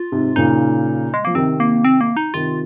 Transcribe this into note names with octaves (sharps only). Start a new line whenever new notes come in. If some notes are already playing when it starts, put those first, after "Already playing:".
Already playing: F4
G#2 C3
A#2 C#3 D#4
G#3
F3 A#3
C3 D#3 C4
A#3
C4
A#3
D#4
C3 D#3 F4